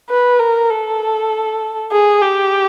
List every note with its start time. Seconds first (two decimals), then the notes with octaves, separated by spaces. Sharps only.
0.10 B4
0.39 A#4
0.70 A4
1.92 G#4
2.22 G4